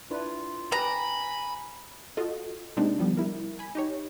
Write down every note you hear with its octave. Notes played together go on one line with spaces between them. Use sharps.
D4 E4 F4 B4
G4 B4 G#5 A#5 B5
F4 F#4 A4 D#5
C3 G#3 A#3 D4 D#4
D3 F3 G3 B3
G3 E4 A#4
G#5 B5
D#4 G4 C#5